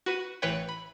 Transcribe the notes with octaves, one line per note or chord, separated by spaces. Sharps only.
F#4 B4 D#7
A1 E3 B4 C#5 G5
B5